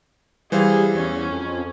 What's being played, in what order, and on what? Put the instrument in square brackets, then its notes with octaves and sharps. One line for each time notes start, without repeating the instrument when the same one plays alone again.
[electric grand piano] E3 C5 F5 [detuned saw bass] G3 [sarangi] G#4
[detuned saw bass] E2 [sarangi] C#4
[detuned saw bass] F2